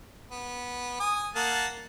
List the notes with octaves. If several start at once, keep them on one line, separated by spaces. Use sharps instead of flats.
B3
G#5 D#6
A#3 F#5 A5